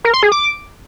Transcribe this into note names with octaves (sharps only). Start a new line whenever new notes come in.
A#4
C6
G#4
D6